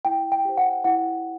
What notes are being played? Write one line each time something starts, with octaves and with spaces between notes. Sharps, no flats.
E4 G5
G5
G4 C5
F#5
E4 F#5